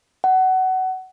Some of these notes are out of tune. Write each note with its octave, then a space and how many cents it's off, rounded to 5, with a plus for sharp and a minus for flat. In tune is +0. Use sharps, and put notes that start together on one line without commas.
F#5 +20